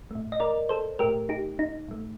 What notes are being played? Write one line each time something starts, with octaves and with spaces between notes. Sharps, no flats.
A2 A3
D#5
A#4 D5
A4 C5
A2 A3 G4 A#4
D#4 G4
D#4
A2 A3